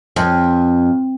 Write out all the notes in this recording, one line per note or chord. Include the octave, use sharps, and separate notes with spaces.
F2